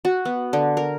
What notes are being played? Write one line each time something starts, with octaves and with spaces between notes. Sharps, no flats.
F#4
B3
D3
A#4